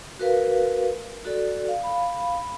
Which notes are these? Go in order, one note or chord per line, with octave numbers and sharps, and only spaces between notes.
F#4 A#4 B4 F5
F#4 A4 D5
F5
F5 B5